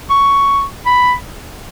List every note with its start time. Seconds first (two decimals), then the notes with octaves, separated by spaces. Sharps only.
0.10 C#6
0.86 B5